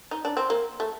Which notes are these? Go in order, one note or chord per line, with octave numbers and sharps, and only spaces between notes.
D#4
D4
C4
A#3
A3